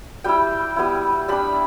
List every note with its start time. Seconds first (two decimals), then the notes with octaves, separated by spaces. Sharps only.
0.24 G3 E4 G5
0.76 G3 B3 E4
1.28 G3 D4 B5